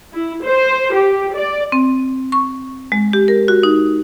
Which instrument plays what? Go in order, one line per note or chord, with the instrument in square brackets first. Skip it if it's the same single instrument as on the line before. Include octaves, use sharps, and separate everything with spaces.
[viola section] E4
C5
G4
D5
[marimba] C4
C#6
G#3
G4
A#4
F#4
D#4